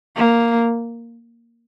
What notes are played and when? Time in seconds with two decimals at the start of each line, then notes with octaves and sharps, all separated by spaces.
0.17 A#3